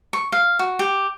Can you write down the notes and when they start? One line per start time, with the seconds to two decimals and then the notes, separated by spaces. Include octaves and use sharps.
0.13 C#6
0.32 F5
0.59 F#4
0.79 G4